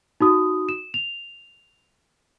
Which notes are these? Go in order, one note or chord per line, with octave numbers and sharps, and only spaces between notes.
D#4 F#4 D#6
E7
F7